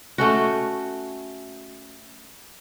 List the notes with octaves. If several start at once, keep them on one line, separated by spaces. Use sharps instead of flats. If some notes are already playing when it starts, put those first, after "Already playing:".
A3 C#4 F#4